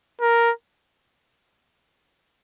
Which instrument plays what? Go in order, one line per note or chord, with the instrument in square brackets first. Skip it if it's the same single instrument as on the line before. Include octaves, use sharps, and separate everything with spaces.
[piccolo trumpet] A#4